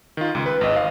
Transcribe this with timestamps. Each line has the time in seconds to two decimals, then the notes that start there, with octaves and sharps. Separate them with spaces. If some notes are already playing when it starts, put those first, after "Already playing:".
0.17 D#3 F4
0.35 C#2
0.46 B4
0.61 G#1 D#5
0.76 D#5 F5